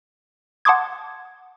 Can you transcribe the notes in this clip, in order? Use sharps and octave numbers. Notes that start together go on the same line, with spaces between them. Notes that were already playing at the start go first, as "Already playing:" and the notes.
F#5 A5 C6 D6 D#6 G#6